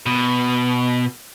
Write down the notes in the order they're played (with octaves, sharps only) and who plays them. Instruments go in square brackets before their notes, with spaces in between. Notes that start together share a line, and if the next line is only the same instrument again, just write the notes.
[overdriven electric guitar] B2